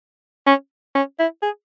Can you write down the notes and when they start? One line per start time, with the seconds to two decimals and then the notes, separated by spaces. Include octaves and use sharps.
0.47 C#4
0.95 C#4
1.19 E4
1.42 G#4